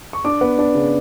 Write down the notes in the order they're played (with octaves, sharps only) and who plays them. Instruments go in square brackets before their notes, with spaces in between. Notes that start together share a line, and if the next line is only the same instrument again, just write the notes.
[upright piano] C#6
D4 D6
B3
D4
C#3